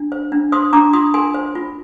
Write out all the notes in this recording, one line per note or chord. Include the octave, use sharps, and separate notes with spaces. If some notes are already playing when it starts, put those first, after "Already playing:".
Already playing: D4
C5
D4
C5 C6 D#6
D4 A#5 D6
F4 C6 D#6
A#4 G#5 C6
C5
F4